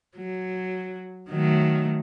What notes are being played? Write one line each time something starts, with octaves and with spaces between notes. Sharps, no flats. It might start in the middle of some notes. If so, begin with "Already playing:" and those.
F#3
D#3 F#3 A3